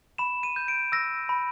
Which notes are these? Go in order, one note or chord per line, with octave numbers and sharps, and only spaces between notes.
B5 E7
D#7
G6
D7
E6 A#6
B5